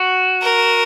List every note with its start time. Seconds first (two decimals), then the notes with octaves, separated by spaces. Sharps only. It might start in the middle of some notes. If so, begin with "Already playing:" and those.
Already playing: F#4
0.42 A#4